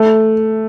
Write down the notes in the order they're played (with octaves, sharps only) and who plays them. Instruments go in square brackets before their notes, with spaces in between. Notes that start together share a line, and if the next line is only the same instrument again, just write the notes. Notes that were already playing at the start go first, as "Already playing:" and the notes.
Already playing: [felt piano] A3